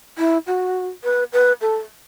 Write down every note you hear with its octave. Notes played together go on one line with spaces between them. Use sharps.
E4
F#4
B4
B4
A4